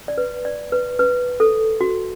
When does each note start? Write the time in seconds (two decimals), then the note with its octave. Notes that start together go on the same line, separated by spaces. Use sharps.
0.08 D5
0.18 B4
0.45 D5
0.72 B4
0.99 B4
1.40 A4
1.81 F#4